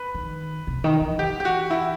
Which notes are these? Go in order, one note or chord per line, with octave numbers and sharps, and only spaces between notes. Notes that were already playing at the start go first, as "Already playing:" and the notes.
Already playing: B4
D#3
C3
D#3
E3
E3 G4
G4
F#4
E4